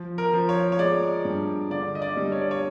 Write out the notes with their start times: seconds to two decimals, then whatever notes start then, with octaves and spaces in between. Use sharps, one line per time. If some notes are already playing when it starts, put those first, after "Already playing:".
Already playing: F3
0.18 A#4
0.33 F3
0.49 C#5
0.72 C#5
0.79 G#3 D5
1.25 G2
1.70 D3 D5
1.95 D#5
2.02 D5
2.17 G3
2.32 C#5
2.41 D5
2.51 C#5